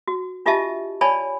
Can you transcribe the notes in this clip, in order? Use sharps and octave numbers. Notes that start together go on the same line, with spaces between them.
F#4
D4 F4 G4 D#5 E5 A5
C#5 D5 G#5 A5 B5